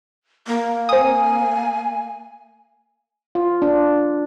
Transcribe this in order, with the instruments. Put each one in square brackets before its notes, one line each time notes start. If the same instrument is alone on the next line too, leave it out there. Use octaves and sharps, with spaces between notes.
[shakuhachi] A#3
[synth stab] C4 D#6 [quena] G#5
[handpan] F4
D4